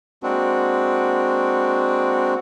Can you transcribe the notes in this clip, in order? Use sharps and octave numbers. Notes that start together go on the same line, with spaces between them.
G#3 A#3 C4 D4 F#4